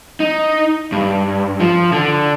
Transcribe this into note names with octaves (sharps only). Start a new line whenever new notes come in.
D#4
G2
F3
D3